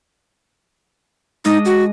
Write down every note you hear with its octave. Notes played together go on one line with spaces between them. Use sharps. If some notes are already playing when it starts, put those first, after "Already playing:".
G#3 D4 D#4 D#5
F#4